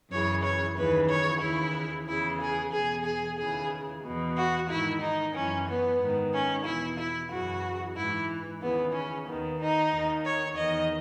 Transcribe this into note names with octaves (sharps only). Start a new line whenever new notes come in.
F#2 C#3 E3 C#5
C#5
D#2 C#3 E3 B4
C#5
D#2 C#3 E3 E4
E2 C#3 E3 E4
G#4
E2 B2 G#4
G#4
D#2 C#3 E3 G#4
E2 B2
F#4
G#2 D#3 E4
D#4
F#2 E3 C#4
B3
G#2 D#3
C#4
E2 B2 E4
E4
F#2 C#3 E3 F#4
G#2 E3 E4
D#2 C#3 E3 B3
C#4
D#2 D#3 B3
D#4
D#2 D#3
C#5
E2 D#3 D#5